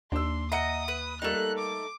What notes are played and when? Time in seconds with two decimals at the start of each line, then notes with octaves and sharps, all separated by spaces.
0.12 D#2 D4 C6 E6
0.52 D#5 E5 F#5 A#5 D#6 C#7
0.88 B4
1.22 G3 A3 A#3 D#4 F#6
1.58 D6